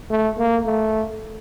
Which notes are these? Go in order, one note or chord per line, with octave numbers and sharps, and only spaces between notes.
A3
A#3
A3